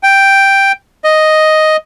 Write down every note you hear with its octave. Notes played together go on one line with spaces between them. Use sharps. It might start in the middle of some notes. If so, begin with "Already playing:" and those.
G5
D#5